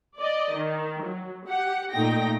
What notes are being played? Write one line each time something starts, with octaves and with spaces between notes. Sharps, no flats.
D5 D#5
D#3
F#3
G4 F#5
A#2 A3 D#4 G5 A#6